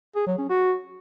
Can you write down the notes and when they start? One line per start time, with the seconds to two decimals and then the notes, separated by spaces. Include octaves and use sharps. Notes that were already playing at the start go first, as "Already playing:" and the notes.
0.15 G#4
0.27 F#3
0.38 C#4
0.50 F#4